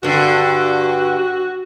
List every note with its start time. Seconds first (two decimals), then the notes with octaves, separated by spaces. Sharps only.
0.03 G2 D3 F#4